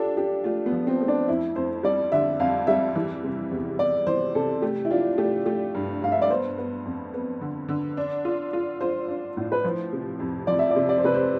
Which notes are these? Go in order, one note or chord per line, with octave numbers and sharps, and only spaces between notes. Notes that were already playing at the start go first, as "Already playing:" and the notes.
Already playing: D4 F4 G4 A4
D4 G4
A3 F4
B3
F3
C4
A3
D4
F2 E4
F2 C5
G3 D5
D3 E5
F2 F5
G3 E5
E3
C3
E2
E2 D5
E3 C5
C3 A4
A3 G4
E4
D4 F4
A3 G4
A3 G4
G2
G2 F5
E5
D5
B3 C5
B3
F2
B3
D3
D3
D4
F4
F4
F4 C5
D4
A2
B4
F3 C5
C3
F2
F3 D5
E5
D5
C3
D5
C5
C3 B4
C5